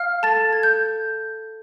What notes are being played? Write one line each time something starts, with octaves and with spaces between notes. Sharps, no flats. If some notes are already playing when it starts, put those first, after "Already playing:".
Already playing: F5 F6
A4 A5 A6
A4 G#6
G6